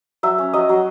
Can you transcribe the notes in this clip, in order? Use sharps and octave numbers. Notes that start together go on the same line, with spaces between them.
F#3 E5
C#4
F#3 D#5
F#3